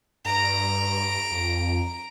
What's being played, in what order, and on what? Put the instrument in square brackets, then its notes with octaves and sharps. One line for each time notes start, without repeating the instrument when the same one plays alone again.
[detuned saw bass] G2 [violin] A#5 D7
[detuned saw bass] F2